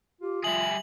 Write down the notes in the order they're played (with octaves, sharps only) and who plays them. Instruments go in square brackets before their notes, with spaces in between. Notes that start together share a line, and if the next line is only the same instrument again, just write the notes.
[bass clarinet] F4 [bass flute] G4
[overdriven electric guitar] G3 G#4 [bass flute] E5 [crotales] F#7